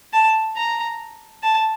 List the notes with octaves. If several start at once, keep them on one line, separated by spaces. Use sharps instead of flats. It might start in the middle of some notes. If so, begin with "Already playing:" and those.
A5
A#5
A5